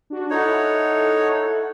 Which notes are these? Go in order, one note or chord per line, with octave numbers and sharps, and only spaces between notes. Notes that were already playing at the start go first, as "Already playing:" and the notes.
D4 F#4
D#4 E4 A4 C#5 F#5